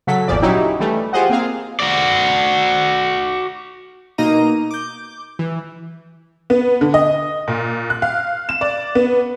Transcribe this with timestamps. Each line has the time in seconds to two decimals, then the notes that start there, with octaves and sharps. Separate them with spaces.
0.07 C#3 F#3 A4 B6
0.28 G#1 E2 A#2 F3 D5
0.42 F#3 C#4 D#4 E4 G4
0.80 E3 G3 A3
1.13 F4 G4 G#4 C5 D#5 F#5
1.30 A#3 C4 G#4 F5
1.80 F#4 D5
4.18 B2 A#3 D#4 D#5 A#5 D#7
4.71 D6 G6
5.39 E3
6.50 B3
6.81 D3
6.94 D#5
7.48 A#2
7.90 F#6
8.02 F5
8.49 E7
8.61 D5
8.95 B3